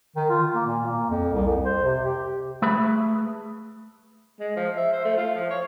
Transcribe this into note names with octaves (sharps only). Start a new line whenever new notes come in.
D#3
F4
A#3
A#2
A#3
F2
C2
F2
C5
C3
G4
A3 G#4 B4 B5
G#3
F3
E5
C5
A3
F4
F3
C#5